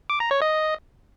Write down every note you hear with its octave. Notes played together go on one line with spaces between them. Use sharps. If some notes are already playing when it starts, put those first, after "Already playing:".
D6
A#5
C#5
D#5